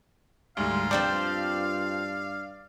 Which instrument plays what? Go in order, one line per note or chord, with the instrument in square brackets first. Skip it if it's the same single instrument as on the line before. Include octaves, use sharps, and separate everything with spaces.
[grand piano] D2 G#2 [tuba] G3 [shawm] F5
[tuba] G2 [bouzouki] F3 C4 C5 [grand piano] D5